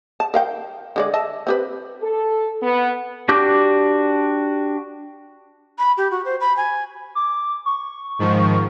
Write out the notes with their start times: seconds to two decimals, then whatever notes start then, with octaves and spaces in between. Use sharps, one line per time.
0.20 A5
0.34 A#4 F5 G5
0.96 D3 G#3 D5
1.14 D#5 E5 A5
1.47 C4 G4 B4
2.01 A4
2.62 B3
3.29 D4 F#4 G4 D6 G6
5.79 B5
5.98 G4
6.11 F#4
6.25 C5
6.40 B5
6.57 G#5
7.15 D6
7.66 C#6
8.19 G#2 D#3 F3